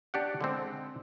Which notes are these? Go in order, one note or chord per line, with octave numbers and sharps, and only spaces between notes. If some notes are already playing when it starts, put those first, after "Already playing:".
D4 G4 F#5
D3 G#3 C4